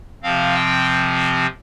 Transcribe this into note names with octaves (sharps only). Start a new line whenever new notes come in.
C3 F3 C4 F5
G5